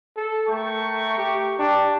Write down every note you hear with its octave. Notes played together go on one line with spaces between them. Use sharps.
A4
A3 A#4 G5 C#6
G4
D4 G4